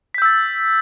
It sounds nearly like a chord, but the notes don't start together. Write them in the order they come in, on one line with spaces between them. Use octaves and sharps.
B6 G6 E6 A6